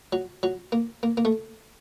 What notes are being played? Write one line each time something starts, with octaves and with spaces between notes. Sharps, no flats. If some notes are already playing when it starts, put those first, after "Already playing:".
F#3
F#3
A#3
A#3
A#3
A3